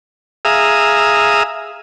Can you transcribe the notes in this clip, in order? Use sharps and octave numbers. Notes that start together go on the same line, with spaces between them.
G#4 E5 F5 A#5 D#6